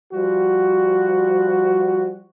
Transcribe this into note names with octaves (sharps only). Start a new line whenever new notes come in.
F3 G3 F#4